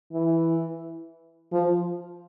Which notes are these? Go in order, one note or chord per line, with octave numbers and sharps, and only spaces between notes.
E3
F3